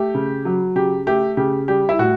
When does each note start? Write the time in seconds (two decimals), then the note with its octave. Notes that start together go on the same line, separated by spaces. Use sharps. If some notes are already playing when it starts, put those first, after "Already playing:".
Already playing: A3 G4
0.15 C#3
0.45 F#3
0.76 C#3 G4
1.07 A3 G4
1.37 C#3 G4
1.68 G3 G4
1.89 E4
1.99 A2 F#4